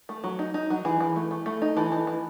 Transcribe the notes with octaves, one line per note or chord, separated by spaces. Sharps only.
A3
F#3
D#4
D#4
F#3
E3 G#4
E3
A3
A3
A3
D#4
E3 A4
E3
E3